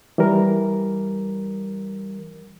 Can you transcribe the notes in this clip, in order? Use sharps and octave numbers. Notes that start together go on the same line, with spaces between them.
E3 G3 A#4